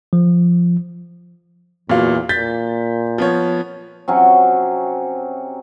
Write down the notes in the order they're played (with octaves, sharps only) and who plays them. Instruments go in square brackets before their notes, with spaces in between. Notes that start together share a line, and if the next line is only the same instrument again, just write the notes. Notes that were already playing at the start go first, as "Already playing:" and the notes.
[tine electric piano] F3
[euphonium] E2 [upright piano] A#2 F#3 F5
[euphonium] A#2 [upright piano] G6 A6 B6
[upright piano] F3 B3 C#5
[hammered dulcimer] C3 F#3 C#4